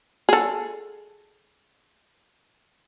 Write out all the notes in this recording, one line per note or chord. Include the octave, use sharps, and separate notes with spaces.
G#4 A4